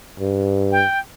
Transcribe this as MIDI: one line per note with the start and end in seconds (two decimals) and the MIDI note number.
0.20 0.84 43
0.72 0.99 79